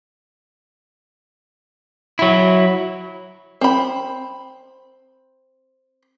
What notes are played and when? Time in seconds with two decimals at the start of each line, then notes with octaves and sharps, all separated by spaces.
2.19 F#3 E4
3.61 C4 B5